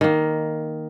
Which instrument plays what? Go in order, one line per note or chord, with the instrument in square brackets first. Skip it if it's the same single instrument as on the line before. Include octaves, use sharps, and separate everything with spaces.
[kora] D#3 A#3